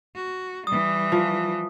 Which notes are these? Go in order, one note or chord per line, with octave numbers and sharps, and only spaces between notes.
F#4
E3 G3 D#6
F3